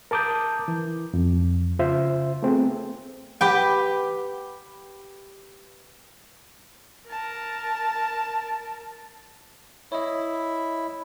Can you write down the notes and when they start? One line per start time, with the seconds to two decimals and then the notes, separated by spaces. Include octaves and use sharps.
0.11 A#4 A5 D6 D#6 G6
0.68 E3
1.14 F2
1.79 C#3 F4 C5 E5
2.43 A3 B3 C4 G#4 A4
3.41 G4 B4 G5
7.08 A#4 A5
9.92 E4 C#5 D#5